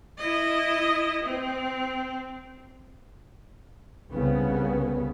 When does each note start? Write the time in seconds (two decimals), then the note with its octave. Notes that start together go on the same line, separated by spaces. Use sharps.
0.18 E4 D#5
1.23 C4
4.12 C2 C#3 B3